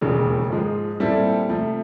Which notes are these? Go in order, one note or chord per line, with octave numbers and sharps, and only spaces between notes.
E1 D#2 C#3 F3
G#2 F3 G#3
A#2 G3 C4 E4 A4
C3 F3 A3